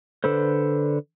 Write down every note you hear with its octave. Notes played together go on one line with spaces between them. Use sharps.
D3 A4 B4 C5